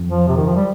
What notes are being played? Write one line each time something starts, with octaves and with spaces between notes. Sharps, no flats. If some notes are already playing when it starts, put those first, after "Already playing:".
Already playing: F2
F3
C3
D#3
F3
G3